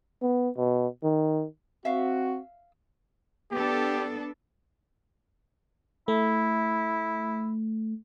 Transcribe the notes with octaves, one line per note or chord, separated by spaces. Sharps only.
B3
B2
D#3
C4 F#4 E5 F5
B3 D4 G4 A4
A3 E4